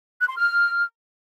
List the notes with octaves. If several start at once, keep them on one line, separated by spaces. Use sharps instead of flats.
F#6
C6
F6